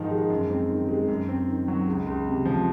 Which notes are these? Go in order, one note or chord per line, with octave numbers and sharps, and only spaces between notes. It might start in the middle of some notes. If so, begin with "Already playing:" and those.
Already playing: G#2 D#3 F3 D#4
G#3
F#2
C4
D#3
G#3
F#2
C4
D#3
F#3
C#2
C#2
C3
F3